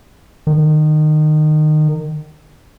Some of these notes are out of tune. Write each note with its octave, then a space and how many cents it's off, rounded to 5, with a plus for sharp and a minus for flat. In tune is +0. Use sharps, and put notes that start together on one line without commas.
D#3 -25